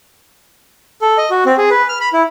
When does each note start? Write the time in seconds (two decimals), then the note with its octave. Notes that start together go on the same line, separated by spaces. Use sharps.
1.02 A4
1.18 D#5
1.30 F#4
1.46 C4
1.58 G#4
1.70 B4
1.89 F6
2.01 B5
2.13 E4